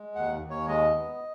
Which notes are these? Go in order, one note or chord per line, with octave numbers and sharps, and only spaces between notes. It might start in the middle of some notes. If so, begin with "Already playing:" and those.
Already playing: G#3
D#2 F#5
D#2
C#5
G#3 D#5
B3